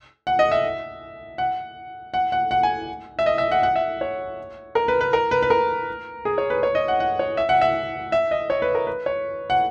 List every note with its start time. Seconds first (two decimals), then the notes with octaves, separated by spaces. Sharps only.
0.27 F#5
0.39 D#5
0.52 E5
1.38 F#5
2.14 F#5
2.32 F#5
2.51 F#5
2.63 G#5
3.19 E5
3.26 D#5
3.38 E5
3.51 F#5
3.63 F#5
3.76 E5
4.01 C#5
4.75 A#4
4.88 B4
5.01 B4
5.13 A#4
5.31 B4
5.42 B4
5.50 A#4
6.25 G#4
6.38 C#5
6.50 B4
6.63 C#5
6.75 D#5
6.88 F#5
7.00 F#5
7.19 C#5
7.37 E5
7.49 F#5
7.61 E5
8.12 E5
8.31 D#5
8.50 C#5
8.62 B4
8.75 A#4
8.87 B4
9.06 C#5
9.50 F#5